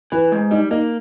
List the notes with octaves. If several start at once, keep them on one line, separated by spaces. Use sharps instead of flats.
E3 B4
G#2
G3 D#4
A#3 D#4